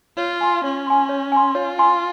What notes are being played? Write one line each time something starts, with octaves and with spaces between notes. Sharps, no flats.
F4 C#5
G#5 C6
C#4 C#5
G#5 C6
C#5
G#5 C6
F4 C#5
G#5 C6